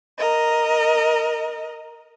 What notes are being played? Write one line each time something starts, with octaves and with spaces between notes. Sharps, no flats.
A#4 D#5